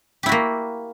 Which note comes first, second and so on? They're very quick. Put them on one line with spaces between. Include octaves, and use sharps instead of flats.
G4 E4 F#4 A#3